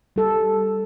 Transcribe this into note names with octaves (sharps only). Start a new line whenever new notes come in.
G3 A4